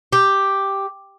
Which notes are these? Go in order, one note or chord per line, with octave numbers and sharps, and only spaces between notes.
G4